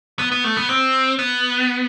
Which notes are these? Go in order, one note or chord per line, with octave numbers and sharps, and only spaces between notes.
B3
B3
A3
B3
C4
B3